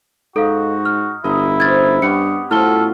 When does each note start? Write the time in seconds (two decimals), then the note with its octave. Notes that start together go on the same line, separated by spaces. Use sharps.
0.36 G#2 D#4 F#4 A4 F5
0.85 F6
1.24 G1 E4 D#5 A#5 C6
1.60 C#4 C5 G#6 A6
2.02 G2 B3 G4 C#6 C#7
2.51 A2 F#3 C#4 F4 A4 F6 G7